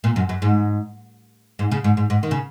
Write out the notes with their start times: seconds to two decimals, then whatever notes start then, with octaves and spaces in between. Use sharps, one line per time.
0.04 A#2
0.16 F#2
0.29 F#2
0.42 G#2
1.59 G#2
1.72 C#3
1.84 G#2
1.97 G#2
2.10 G#2
2.23 D#3
2.31 C#3